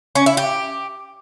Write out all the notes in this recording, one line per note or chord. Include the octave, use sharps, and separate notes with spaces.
C#4
E4
G4